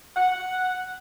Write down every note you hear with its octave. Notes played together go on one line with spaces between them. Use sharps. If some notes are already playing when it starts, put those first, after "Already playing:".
F#5